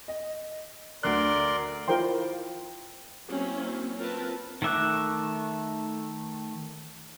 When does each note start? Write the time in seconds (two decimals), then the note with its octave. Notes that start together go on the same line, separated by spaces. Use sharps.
0.08 D#5
1.03 D2 D3 A#4 D5 C6 F#6
1.88 E4 F4 A#4 C5 G5 C6
3.27 F#3 A#3 C4 C#4 E4
3.98 C4 F4 A#4 B4 A5
4.62 D#3 A3 E5 D6 F#6